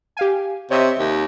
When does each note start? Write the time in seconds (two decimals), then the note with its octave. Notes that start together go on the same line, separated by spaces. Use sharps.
0.17 G4 F5 G#5
0.71 C3 C#5 D#5 E5
0.99 D#2